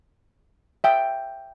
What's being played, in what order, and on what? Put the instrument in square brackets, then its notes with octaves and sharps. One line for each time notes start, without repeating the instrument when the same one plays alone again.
[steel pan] E5 G5